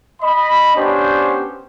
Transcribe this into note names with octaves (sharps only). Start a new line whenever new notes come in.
D#5 B5
B3 C#4 D4 G4 C5